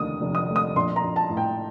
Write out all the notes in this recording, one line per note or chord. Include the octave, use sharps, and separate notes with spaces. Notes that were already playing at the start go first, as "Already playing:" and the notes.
Already playing: F1 D#2 D3 A3 D#6
F1
D#6
A3
D#6
A#1 C6
A#5
A#1
A5
A2
G5